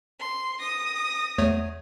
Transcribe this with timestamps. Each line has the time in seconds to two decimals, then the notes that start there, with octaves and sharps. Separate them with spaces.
0.20 C6
0.59 D#6 A#6
1.38 E2 A3 C#5